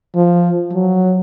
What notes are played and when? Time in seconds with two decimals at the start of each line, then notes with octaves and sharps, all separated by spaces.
0.15 F3
0.73 F#3